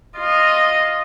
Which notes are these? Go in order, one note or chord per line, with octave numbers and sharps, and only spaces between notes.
F4 D#5